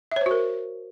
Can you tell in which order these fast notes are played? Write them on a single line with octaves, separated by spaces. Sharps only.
E5 C#5 C5 F#4 A#4